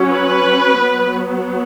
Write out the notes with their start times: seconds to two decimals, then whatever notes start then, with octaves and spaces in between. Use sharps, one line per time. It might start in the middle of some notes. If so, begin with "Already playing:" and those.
Already playing: F#3 C#4
0.12 B4
0.81 F#3 B3